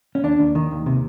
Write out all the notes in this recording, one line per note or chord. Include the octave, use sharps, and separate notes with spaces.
C#4
D#2 D4
D#2
D#3
D#2
C3